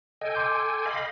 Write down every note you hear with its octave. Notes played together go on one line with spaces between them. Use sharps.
A4 D#5 G5 G#5
C6 D6 G6
D#5 F5 B5